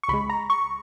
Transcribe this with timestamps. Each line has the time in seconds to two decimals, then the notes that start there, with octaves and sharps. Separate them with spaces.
0.03 C#6
0.08 C#2 C#3 G#3 B5
0.30 A#5
0.50 C#6